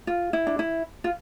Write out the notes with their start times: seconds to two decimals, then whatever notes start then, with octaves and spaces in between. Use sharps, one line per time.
0.07 F4
0.33 E4
0.47 D4
0.59 E4
1.04 F4